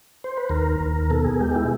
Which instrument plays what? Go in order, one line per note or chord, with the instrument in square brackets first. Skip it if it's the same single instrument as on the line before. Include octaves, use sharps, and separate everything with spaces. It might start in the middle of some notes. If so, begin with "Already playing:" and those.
[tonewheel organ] C5
B4
D#2 A#4
D#2
B2 A4
G#4
G#3 G4
E4